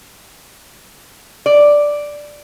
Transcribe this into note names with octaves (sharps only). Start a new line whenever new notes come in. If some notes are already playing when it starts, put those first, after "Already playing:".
D5